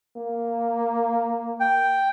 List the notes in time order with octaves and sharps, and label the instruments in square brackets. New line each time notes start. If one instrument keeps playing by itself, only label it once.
[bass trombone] A#3
[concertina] G5